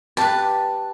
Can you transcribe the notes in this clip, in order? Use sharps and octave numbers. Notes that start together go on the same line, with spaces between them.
G4 B4 A5